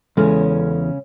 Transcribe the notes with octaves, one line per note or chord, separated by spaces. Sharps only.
E2 C#3 G#3 C#4 A4